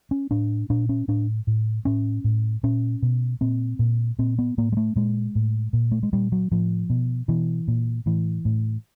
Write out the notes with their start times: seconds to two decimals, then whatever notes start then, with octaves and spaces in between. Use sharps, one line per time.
0.11 C#4
0.31 A2 D4
0.70 A#2 D4
0.89 C#4
1.08 A2 D4
1.47 A2
1.85 A2 C#4
2.24 A2
2.63 A#2 C#4
3.02 B2
3.41 A#2 C4
3.79 A#2
4.19 A#2 C4
4.38 B3
4.58 A2 A#3
4.72 G#3
4.77 A3
4.96 A#2 G#3
5.35 A2
5.73 A#2
5.91 A3
6.03 G#3
6.13 A#2 G3
6.32 F#3
6.51 A2 F3
6.90 B2
7.28 B2 E3
7.68 A#2
8.06 A2 E3
8.45 A2